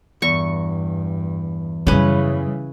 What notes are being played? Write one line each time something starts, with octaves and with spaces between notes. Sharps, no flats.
E2 G2 C#6
F#2 C#3 E3 G3 C#4 B4